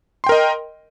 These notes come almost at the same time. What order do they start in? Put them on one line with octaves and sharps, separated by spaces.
C6 G5 A#4 D#5